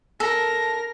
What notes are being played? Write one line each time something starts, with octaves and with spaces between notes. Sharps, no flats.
A4 A#4 A#6